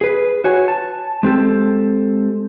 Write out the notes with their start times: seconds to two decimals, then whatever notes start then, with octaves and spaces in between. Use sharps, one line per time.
0.01 G#4 B4
0.44 F#4 C#5 G#5
0.68 A5
1.23 G#3 C4 G4 A4